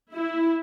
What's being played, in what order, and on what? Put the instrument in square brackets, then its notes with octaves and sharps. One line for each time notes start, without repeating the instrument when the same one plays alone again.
[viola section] E4